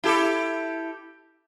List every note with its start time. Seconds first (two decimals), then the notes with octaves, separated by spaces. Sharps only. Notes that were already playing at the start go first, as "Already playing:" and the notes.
0.04 E4 G4 A4